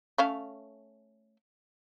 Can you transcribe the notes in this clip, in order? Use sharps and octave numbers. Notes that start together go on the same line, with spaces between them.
A3 C#4 F5